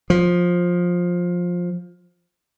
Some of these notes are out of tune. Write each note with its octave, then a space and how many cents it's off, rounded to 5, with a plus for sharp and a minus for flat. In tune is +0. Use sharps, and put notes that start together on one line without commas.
F3 +15